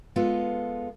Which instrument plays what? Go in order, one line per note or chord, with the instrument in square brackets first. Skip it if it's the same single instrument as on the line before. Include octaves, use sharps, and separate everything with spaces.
[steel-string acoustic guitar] G#3 B3 F4 A4